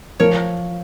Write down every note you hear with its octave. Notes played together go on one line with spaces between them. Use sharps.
F3 A#4 C#5